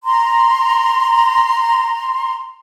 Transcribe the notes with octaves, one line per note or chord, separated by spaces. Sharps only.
A#5 C6